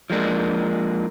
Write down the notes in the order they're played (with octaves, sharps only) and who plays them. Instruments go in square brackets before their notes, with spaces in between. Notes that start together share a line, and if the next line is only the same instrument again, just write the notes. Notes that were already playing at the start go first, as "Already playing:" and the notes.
[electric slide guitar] F3 G#3 A#3 D4